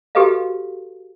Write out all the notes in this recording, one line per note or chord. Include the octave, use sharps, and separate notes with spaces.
F#4 G4 A4 B4 D#5 F5